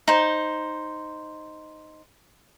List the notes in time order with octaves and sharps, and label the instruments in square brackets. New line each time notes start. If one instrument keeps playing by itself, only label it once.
[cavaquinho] D#4 C5